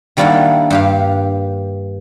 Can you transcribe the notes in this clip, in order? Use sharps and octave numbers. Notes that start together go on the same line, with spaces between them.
D#3 G3 A#3 D4 E4 F#5
G2 G4 F5